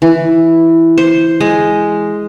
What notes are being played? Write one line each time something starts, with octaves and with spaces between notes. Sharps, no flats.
E3
C5
G#3